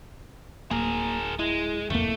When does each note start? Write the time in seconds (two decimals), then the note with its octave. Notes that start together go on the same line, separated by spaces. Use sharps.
0.71 D1 A#3 G#4 A#4
1.39 G#3 E4
1.90 D1 C2 F2 A3 A#3